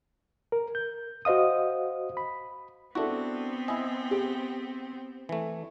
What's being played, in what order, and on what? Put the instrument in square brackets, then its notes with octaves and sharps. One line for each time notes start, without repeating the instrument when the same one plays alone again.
[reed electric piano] A#4
G6
F#4 C5 D#5 F5 D#6
B5
[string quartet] B3 C4 [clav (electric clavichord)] D4 F#4 [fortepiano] E4 A4
[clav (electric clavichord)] E4 D#5 [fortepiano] G#5
[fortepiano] G4
[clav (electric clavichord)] E3 A3